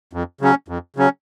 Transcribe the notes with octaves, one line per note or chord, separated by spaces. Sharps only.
F2
C#3 F#3 C#4
F2
C#3 F#3 C#4